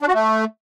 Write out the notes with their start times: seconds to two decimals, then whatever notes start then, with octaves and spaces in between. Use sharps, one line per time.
0.02 D4
0.08 F#4
0.14 A3